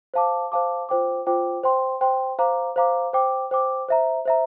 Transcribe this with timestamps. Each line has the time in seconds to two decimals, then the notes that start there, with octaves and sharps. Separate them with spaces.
0.14 C5 F5 A5 D6
0.52 C5 F5 A5 D6
0.89 F4 C5 G5 D6
1.27 F4 C5 G5 D6
1.63 C5 G5 C6
2.01 C5 G5 C6
2.39 C5 F5 A#5 D6
2.76 C5 F5 A#5 D6
3.13 C5 G5 D6
3.51 C5 G5 D6
3.88 C5 E5 A#5
4.25 C5 E5 A#5